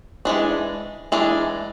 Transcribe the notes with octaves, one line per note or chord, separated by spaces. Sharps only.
E3 G#3 D4
E3 G#3 D4